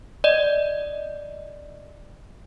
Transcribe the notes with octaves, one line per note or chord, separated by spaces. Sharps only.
D5 D#5